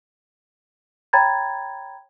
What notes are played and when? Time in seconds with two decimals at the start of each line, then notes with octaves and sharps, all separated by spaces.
1.13 C#5 G5 A#5 B5 G#6 A6